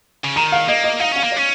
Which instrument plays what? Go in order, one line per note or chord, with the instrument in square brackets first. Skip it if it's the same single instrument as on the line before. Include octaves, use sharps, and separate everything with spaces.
[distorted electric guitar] C#3
[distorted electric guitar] D#3 [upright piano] A#5
[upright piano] F5
[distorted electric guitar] A#3 [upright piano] D#5
[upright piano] D#5
[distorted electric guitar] D#4 [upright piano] F5
[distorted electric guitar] C#4 [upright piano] F5
[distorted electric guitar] A#3
[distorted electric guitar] C#4 [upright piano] C#5